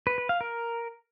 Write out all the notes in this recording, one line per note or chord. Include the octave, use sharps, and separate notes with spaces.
B4
B4
F5
A#4